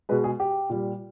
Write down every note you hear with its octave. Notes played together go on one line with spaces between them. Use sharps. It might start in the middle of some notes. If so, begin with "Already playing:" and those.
B2 G#3 B4
G#4
G4
A#2 G3